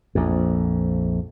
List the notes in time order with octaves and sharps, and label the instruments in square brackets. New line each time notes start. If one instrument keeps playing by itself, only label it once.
[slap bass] A#1 F2